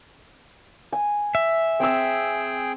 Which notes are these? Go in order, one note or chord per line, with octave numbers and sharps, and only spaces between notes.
G#5
E5
C4 G#4 G5 E6